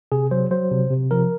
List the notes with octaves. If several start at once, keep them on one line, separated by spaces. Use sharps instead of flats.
C3 G#4
F#3 C5
F#3 C5
C3
C3
F3 A#4